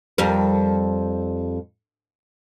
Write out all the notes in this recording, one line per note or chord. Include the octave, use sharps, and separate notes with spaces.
F2 G3 A#4